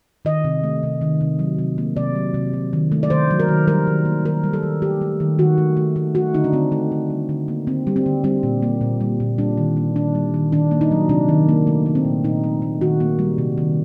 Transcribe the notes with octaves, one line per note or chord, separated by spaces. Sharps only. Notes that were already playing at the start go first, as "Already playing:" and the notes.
D#3 D#5
C3
A3
C3
D#3
C3
F#3
C3
A#3
C3 D5
F#3
C3
F#3
D#3
A3
D5
D#3 C5
F#3
A#4
D#3
G3 A#4
D#3
A#3
D#3 A#4
G3
A4
D#3
A3 G4
A3
D#3
D#3 F#4
A3
A3
A3
A3 F#4
D3 D#4
D4
D3 C4
A3
A3
G3
D3
A#3
D3 C4
G3
C4
D3
G3 C4
A#2
A#3
A#2
G3
A#2
G3 D4
D#3
A#3
D#3 D4
G3
D#3
D#3 D4
A#3
D#4
F#3
C3 D4
D#3
A#3
A3
A3
C4
A#2
A#2 D#4
A3
A3
D#3 F#4
A#3
G3
C3
D#3